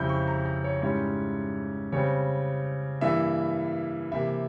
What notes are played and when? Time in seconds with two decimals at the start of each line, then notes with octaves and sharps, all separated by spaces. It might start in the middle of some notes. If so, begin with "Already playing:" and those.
Already playing: F2 C#3 G3 C4 E4 G6
0.09 C#6
0.28 A#5
0.46 A#5
0.64 C#5
0.82 G#2 G3 C#4 E4 C#5
1.92 C#3 G3 C4 C#5
3.01 G2 E3 A#3 E4 E5
4.12 C3 E3 A#3 E4 E5